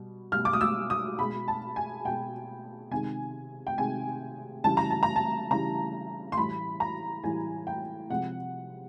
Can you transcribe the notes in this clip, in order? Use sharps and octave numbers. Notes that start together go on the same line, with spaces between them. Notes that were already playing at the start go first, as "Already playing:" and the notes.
Already playing: B2 G3
B2 G3 F6
D6
D#6
E6
D#6
B2 G#3 B5
A5
G#5
B2 G#3 G5
C3 D#3 G#3 G#5
G5
C3 D#3 G#3 G#5
C#3 E3 G3 A5
A#5
A5
A#5
A5
C#3 E3 G3 A#5
C6
A2 E3 G3 B5
A#5
A2 E3 G3 G#5
G5
C3 F3 G#3 F#5